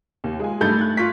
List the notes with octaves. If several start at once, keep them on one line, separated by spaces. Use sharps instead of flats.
D#2
G#3 F4 G#5
G2 A3 D#4 G6 A6
F#6 G#6
F4 C#6 B6